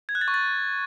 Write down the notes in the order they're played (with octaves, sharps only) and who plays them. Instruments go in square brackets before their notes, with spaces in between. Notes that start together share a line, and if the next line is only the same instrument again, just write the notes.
[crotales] G#6
F#6
A6
C#6
A6